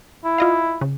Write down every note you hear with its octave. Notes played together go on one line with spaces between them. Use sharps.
E4
F4 D#5 F5
C#3